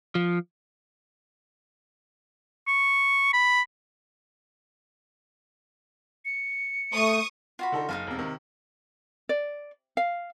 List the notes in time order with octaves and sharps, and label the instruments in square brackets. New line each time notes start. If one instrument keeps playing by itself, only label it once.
[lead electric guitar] F3
[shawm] C#6
B5
[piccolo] C#7
[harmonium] A3 [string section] C#6 D#6
[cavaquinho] F4 F#4 B5
[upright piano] D3 D#4 A4
[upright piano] F#1 [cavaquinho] D#4 F4 F5
[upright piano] E1 C3
C3 D#3
[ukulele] D5
F5